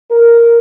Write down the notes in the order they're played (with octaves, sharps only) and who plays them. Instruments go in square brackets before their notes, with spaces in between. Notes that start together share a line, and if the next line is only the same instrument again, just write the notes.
[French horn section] A#4